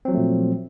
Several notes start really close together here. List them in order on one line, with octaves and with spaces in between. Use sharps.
C4 F#3 F3 A3 A#2